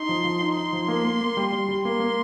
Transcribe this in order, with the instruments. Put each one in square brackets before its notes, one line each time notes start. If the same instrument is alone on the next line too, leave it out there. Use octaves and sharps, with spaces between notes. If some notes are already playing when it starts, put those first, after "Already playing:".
Already playing: [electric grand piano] D#4 [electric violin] C6
[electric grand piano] F3
F3
D#4
[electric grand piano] D#4 [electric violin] C6
[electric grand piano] F3
A#3
A#3
A#3
G3
G3
G3
[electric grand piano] A#3 [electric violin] C6
[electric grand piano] A#3